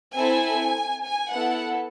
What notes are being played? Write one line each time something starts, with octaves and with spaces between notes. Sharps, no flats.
C4 E4 A4 G#5
G#5
B3 E4 A4 F#5